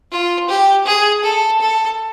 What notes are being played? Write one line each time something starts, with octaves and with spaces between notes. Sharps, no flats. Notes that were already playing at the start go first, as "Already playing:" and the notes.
F4
G4
G#4
A4
A4